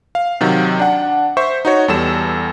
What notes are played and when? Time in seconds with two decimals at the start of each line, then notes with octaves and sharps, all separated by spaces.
0.15 F5
0.41 C3 D#3 F#3
0.79 D4 F#5
1.37 C5 E5 C#6
1.65 D#4 F#4 C#5
1.88 E2 G3 A4 E7